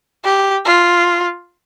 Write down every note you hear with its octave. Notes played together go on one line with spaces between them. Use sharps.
G4
F4